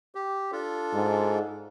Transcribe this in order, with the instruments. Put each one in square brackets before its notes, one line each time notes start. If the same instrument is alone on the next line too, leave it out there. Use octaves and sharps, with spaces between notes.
[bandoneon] G4
D4 F4 A4
[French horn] G#2